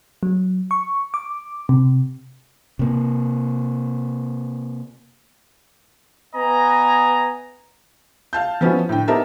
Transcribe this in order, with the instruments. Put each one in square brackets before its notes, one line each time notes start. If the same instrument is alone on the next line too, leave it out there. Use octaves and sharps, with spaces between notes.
[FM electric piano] F#3
C#6
D6
C3
[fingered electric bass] C3 A#3
[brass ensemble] B3 B4 D#5 G#5 A#5
[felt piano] F5 A5 G6
F3 B3 C#4 E4 F#4
A2 D3 G5
B3 D#4 G4 A#4 E5 A5